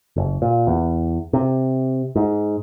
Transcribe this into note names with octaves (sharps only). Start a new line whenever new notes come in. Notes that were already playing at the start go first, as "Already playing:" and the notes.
F#1
A#2
E2
C3
G#2